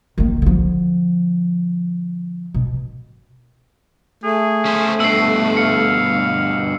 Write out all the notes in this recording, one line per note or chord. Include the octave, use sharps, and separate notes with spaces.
D#3 A#3
D3 F3
B2
A3 G#4
C#4 C5
G2 B2 E6 C7
F5 C#7